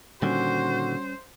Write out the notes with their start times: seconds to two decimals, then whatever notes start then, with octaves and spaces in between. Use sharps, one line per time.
0.22 A#2 D3 D#3 G3 C#4 F#4 C5